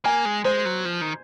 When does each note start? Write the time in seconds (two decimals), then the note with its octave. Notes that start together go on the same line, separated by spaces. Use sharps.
0.04 A#3 G#5
0.25 G#3
0.45 G#3 C5
0.65 F#3
0.85 F3
1.01 D#3